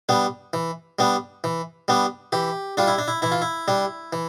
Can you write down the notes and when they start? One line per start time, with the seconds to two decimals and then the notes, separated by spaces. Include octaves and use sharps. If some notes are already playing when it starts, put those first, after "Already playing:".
0.09 G3 B3 D4
0.53 E3
0.99 G3 B3 D4
1.44 E3
1.88 G3 B3 D4
2.32 E3 G4
2.77 G3 D4 F4
2.87 E4
2.98 D4
3.08 E4
3.22 E3 E4
3.32 F4
3.42 E4
3.68 G3 D4
4.13 E3